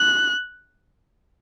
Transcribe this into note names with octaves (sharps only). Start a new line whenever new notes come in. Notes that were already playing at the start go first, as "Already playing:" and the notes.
Already playing: F#6